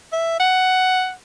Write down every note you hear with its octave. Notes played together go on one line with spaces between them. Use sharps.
E5
F#5